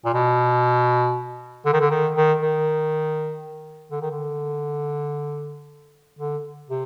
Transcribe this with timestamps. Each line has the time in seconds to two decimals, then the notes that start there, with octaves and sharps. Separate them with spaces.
0.05 A#2
0.14 B2
1.66 D3
1.73 D#3
1.80 D3
1.90 D#3
2.15 D#3
2.41 D#3
3.91 D3
4.02 D#3
4.11 D3
6.19 D3
6.69 C3